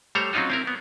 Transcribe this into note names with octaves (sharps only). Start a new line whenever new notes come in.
G3 A3 C5 C#5 A#5
F#3 C4 C#4 D#4 F4 F#4
C4 E4 A#4
B3